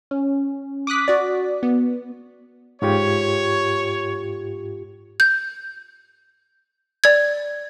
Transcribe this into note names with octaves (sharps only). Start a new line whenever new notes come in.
C#4
D6 D#6 F#6 B6
F#4 D5
B3
G#2 F4 G4 C#5
G6
D5 G#6